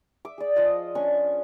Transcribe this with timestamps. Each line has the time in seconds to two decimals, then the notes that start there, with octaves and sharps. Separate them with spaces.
0.25 E5 D6
0.38 G#4 D5
0.56 F3 D5 D#5 F5
0.95 C#4 D4 C#6